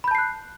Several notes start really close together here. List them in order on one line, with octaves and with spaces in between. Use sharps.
B5 G6 A5 C7 F#6